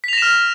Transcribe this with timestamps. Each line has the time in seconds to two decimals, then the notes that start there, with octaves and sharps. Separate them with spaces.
0.04 B6
0.08 F7
0.13 A#6
0.18 E7
0.22 F6